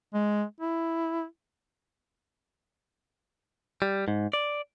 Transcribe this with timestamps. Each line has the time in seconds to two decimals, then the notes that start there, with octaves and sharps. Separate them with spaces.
0.14 G#3
0.60 E4
3.82 G3
4.08 G#2
4.33 D5